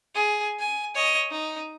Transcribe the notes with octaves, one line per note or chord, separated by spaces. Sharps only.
G#4
G#5
C#5 D#5
D#4